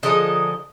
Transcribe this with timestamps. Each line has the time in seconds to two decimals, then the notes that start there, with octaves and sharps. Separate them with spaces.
0.03 D3 F3 G#3 D#4 D#5